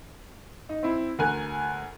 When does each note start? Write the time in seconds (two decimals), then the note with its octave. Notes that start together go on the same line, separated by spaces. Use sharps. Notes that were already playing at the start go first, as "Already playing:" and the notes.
0.69 D#4
0.83 C4 E4
1.19 D2 A#4 G#5 F#6